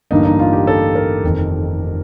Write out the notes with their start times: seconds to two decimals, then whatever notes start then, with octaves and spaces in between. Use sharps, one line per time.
0.11 A1 G2 D3 G3 A#3 D#4
0.25 D#4
0.39 F4
0.53 G4
0.67 A4
0.95 A#4
1.23 F1 F2 D#3